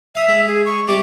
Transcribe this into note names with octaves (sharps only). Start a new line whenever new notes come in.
E5 F5 D#6
G#3
G#4
C#6
C3 G3 G4 D6